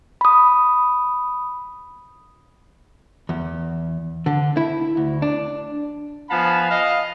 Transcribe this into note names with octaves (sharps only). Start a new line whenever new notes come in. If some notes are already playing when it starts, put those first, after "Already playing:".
B5 D#6
E2
D3
E4
D2
D4
F3 B3 F5 G#5 A5 B5
D#5 F5